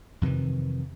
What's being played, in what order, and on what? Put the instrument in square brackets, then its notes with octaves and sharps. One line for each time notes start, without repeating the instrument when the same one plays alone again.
[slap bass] F2 C3 D#3 E3